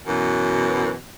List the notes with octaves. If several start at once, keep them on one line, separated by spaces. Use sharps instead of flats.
F#2 B2 E3 F#3